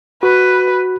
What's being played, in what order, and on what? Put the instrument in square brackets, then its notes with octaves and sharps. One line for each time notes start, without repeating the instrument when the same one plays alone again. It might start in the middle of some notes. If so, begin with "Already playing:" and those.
[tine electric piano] F#4 [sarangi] B4